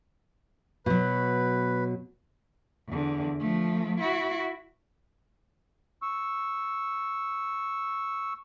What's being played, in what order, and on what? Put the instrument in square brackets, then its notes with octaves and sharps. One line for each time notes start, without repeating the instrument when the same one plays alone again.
[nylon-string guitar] B2 F#3 [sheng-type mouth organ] B4
[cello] E2 D3
F3 A3
E4 F#4
[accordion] C#6 E6